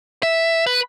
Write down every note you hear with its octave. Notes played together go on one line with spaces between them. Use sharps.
E5
B4